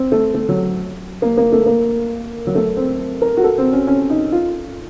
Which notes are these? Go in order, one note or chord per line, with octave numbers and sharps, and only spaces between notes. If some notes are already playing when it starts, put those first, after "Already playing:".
Already playing: C4
A3
A3
F#3
A#3
A#3
A3
A#3
F#3
A3
C4
A#4
F#4
A4
C4
C#4
C#4
D#4
F4